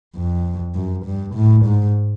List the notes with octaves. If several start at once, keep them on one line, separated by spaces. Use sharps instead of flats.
F2
F#2
G2
A2
G#2